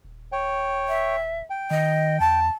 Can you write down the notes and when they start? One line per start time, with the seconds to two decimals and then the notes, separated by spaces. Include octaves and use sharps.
0.04 D#1
0.32 C#5 G5
0.88 E5
1.50 G5
1.71 D#3 D#5
2.20 E2 A5